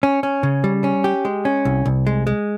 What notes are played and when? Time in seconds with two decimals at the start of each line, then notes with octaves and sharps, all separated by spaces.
0.03 C#4
0.23 C#4
0.43 C#3
0.64 G3
0.84 C#4
1.04 G4
1.25 G#3
1.45 C#4
1.65 C2
1.85 C2
2.07 G#3
2.27 G#3